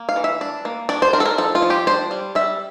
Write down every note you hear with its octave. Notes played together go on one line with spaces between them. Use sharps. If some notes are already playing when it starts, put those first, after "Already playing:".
Already playing: A#3
F5
E3
E5
D4
A#3
D4 D5
C5
D4 A#4
A4
A#4
F3 A4
F4
F3
G4
D4 C5
G3
G3 E5